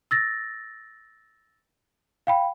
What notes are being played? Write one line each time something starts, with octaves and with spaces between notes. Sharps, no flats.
E6 A6 A#6
F5 G5 B5